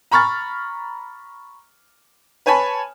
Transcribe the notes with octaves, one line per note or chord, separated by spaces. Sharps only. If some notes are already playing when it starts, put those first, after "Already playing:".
A#5 B5 C#6 F6 A6
B4 C#5 G#5 A5 B5